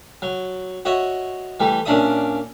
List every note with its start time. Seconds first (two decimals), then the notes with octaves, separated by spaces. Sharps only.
0.22 F#3
0.85 F#4 C#5 D#5 E5
1.60 E3 G3 A3
1.85 A#2 C#4 D4 D5 E5 D#6